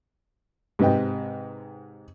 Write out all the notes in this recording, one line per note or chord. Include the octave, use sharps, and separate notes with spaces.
G#2 C3 B4 D#5 G5